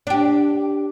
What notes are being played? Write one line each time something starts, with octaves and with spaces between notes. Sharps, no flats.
D4 G4